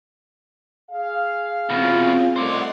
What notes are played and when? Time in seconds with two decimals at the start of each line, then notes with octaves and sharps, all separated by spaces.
0.90 G#4 F5
1.70 E2 B2 C4 C#4 F4
2.36 G3 A3 C5 D5 D#5 F#5 C6